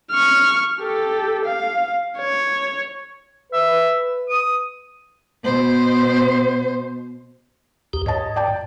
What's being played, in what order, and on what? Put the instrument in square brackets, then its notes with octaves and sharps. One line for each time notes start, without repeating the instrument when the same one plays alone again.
[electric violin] C#6 F6
G4 A4
F5
C#5
[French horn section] B4 [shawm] E5
[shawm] D#6
[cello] B2 C5
[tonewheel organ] D#2 G4
[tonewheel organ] G#2 [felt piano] C#5 D#5 A5
[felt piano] D5 G5 A5